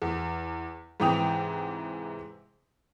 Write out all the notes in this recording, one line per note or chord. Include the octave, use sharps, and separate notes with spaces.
E2
G#2 C3 E3 G5 D#6 F7